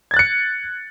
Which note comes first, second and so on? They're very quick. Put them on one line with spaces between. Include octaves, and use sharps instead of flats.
G#6 A6 F#6 C#7